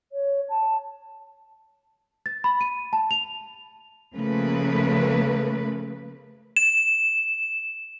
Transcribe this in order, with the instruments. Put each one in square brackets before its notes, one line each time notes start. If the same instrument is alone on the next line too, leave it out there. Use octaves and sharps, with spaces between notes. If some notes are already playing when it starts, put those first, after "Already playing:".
[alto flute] C#5
A5
[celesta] A6
B5
D#7
A5
F7
[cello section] C#3 F3 A3 A#3 B4
[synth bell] E7